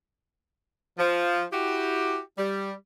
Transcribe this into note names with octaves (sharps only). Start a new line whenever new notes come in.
F3
E4 F#4 G4
G3